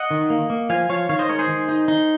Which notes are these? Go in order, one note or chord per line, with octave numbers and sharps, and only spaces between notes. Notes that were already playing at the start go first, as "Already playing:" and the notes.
Already playing: D#5 F#5
D#3
A#3
A#3
F3 F5 G#5
F3 C#5 F5
D#3 C#5 F5
C5 D#5
G#3 A#4 C#5
G#4 C5
D#3
D#4
D#4